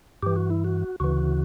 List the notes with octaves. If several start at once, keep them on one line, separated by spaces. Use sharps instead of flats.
G2 E3 G4
F#4
E4
F#4
D2 C#3 E3 F#4